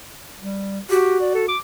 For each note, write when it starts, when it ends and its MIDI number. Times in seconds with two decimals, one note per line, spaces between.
0.40 0.80 55
0.90 1.48 66
0.90 1.17 67
1.21 1.34 74
1.34 1.47 69
1.48 1.58 86